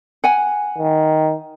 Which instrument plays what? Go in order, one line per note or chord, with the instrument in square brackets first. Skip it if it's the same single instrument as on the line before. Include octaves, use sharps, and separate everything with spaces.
[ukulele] F#5 G#5
[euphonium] D#3